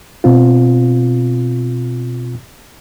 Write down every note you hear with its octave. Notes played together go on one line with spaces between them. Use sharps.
B2 C4 F4